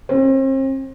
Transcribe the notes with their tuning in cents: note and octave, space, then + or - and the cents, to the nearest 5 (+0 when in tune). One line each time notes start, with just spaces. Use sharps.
C4 +40